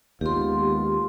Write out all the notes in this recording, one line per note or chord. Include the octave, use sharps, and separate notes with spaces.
D#2 G#3 B3 F4 G4 C6